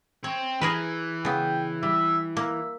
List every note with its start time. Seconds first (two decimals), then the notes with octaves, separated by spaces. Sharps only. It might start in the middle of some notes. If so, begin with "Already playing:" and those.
0.24 C4 C#5
0.61 E3 G#4 A#4 B4
1.25 C#3 B3 G5
1.83 G3 E5
2.37 A#3 E5